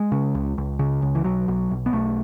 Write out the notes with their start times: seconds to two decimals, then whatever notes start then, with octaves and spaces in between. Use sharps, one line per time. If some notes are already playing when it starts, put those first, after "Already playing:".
Already playing: G#3
0.12 C#3
0.35 C#2
0.58 C#2
0.79 C#3
1.02 C#2
1.15 E3
1.24 B1 F#3
1.48 B1
1.71 B1
1.86 B3
1.93 B1 A3